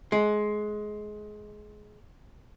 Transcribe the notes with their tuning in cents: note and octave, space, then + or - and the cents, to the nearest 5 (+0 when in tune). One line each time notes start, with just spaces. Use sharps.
G#3 +20